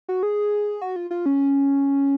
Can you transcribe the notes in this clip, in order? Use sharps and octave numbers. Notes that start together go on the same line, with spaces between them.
F#4
G#4
F#4
F4
F4
C#4